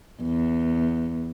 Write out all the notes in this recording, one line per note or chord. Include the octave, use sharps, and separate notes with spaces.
E2